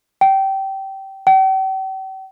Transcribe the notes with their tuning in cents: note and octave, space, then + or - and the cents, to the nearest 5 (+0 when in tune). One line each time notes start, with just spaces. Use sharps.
G5 -20
G5 -40